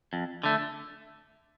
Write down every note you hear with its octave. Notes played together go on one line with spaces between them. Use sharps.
F2
D3 A3